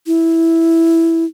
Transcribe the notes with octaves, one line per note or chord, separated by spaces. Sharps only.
E4